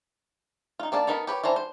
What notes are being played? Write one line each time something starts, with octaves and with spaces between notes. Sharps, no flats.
D#4 F4
A#3 D4 D5 A5
B3 D#4 A#4 A5 B5
G4 B4 C#5
E3 D4 C5 A#5
C5